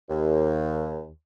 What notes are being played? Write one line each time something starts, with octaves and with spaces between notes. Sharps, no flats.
D#2